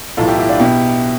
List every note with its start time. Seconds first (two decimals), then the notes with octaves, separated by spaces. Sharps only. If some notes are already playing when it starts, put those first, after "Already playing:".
0.17 B1 A2 E3 F4 A4
0.28 E4 G4
0.38 E4 G4
0.49 D4 F4
0.59 B2 E4 G4